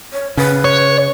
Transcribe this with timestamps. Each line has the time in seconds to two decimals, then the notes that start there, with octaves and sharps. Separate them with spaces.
0.13 C#5
0.37 C#3 B4
0.65 C#5